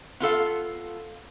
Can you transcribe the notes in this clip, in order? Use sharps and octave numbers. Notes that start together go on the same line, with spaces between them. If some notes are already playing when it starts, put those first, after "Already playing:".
B3 F4 A4 F5